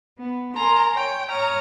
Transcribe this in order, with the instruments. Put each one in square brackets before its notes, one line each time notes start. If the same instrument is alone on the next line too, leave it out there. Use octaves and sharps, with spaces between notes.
[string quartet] B3
[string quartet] A#4 G#5 C6 [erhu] A#5
[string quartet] C#5 [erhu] G5
[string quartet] C#5 D#6 F6 [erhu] A#5